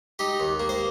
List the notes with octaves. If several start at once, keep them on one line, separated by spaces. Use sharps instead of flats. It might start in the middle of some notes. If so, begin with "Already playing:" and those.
D#4 G4
D#2
A#3
C5